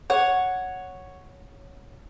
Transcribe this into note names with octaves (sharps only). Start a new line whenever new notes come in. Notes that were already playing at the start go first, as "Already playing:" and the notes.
C#5 F#5